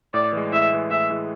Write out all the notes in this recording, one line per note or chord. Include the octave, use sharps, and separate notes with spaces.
A2 D5
E3 G#3
A2 E5
E3 G#3
A2 E5
E3 G#3